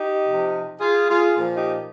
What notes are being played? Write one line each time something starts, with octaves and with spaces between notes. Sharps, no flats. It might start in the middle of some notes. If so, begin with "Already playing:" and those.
Already playing: D#4 G4
C3 F3
F4 G#4
F4 G#4
A#2 F3
D#4 G4